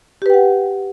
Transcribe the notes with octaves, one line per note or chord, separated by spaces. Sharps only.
G4 B4 F#5 G5